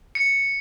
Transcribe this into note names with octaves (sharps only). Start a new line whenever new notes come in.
C#7